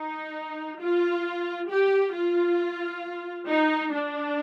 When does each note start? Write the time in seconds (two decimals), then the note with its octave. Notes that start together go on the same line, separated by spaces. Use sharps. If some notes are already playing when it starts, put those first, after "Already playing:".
Already playing: D#4
0.80 F4
1.70 G4
2.14 F4
3.48 D#4
3.94 D4